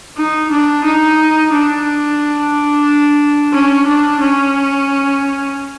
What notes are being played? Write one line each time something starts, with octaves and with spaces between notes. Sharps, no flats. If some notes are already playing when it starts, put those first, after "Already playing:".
D#4
D4
D#4
D4
C#4
D4
C#4